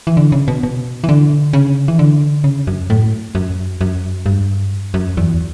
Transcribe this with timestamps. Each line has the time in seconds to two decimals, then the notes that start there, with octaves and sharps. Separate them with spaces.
0.07 E3
0.17 D3
0.32 C#3
0.48 B2
0.63 B2
1.04 E3
1.09 D3
1.53 C#3
1.88 E3
1.99 D3
2.44 C#3
2.67 F#2
2.90 A2
3.35 F#2
3.81 F#2
4.26 G2
4.94 F#2
5.17 E2